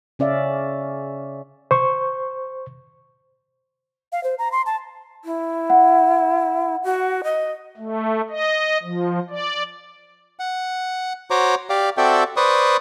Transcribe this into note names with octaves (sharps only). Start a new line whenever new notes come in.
C#3 C#4 D5 E5 F5
C5 C#6
F5
C5
A#5
C6
A5
E4
F#5
F#4
D#5
A3
D#5
F3
D5
F#5
F#4 C5 C#5 A#5 D6
G4 D5 F5
C4 F#4 A4 D5 E5 G5
B4 C5 D5 C#6 D#6